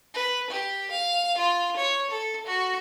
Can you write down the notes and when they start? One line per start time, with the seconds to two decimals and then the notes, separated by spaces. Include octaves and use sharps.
0.14 B4
0.50 G4
0.91 F5
1.37 F4
1.77 C#5
2.11 A4
2.46 F#4